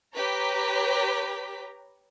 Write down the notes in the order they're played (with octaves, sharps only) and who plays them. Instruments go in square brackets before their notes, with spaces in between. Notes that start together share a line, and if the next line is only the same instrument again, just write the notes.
[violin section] G4 B4 C#5 A#5 B6